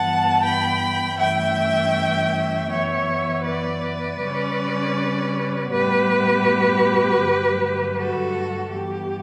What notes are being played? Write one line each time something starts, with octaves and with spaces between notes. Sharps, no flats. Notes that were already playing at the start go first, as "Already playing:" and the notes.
Already playing: G2 E3 B3 F#5 A5
G5 B5
G2 E3 A3 C#4 E5 G5
F#2 E3 B3 C#5 E5
B4 D5
C#3 G3 C#4
A2 G3 B3 G4 B4
G2 D3 F#3 A3
F#4 A4
G2 E3 B3 G4